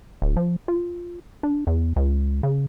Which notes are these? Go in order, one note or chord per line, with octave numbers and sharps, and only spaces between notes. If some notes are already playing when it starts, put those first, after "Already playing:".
D1
F3
F4
D4
E2
C#2
C#3